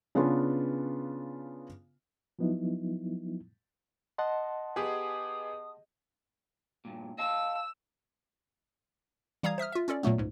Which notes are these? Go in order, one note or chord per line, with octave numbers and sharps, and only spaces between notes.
C#3 B3 C#4 D4 F4 B4
F3 F#3 B3 D#4 E4
D#5 F#5 A5 C6
B3 G4 G#4 D#6
G2 A#2
D#5 F5 A5 E6
E3 G3 F5 A#5 D#6 G#6
C5 E5 D#6 F6
F4 E5
C#4 F4 A4 D5
A#2 F#3 A3 B3
C#2 G#2